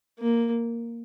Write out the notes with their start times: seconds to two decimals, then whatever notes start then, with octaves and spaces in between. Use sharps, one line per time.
0.19 A#3